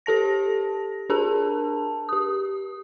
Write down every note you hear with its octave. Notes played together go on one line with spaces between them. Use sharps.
G4 A4 A5 A#6
D4 G#4 A#4 A5
G4 D#6